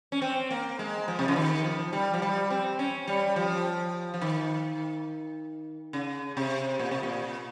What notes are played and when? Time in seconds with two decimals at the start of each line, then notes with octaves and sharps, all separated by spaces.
0.12 C#4
0.22 C4
0.51 A#3
0.79 G#3
1.08 F3
1.19 C3
1.28 C#3
1.36 D#3
1.64 F3
1.93 G3
2.14 F3
2.22 G3
2.50 C4
2.79 C#4
3.08 G3
3.36 F3
4.14 F3
4.22 D#3
5.93 C#3
6.37 C3
6.79 A#2
6.91 C3
7.03 A#2